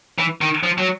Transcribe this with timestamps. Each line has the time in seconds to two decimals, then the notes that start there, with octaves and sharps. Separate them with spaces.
0.18 E3
0.41 D#3
0.63 F3
0.78 F#3